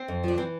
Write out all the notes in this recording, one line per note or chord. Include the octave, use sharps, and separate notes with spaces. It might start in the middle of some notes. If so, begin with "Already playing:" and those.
Already playing: C4
F2
F3 D4
E3 C4